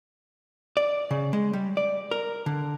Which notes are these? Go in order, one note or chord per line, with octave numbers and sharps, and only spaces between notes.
D5
C#3
G#3
G3
D5
A#4
D3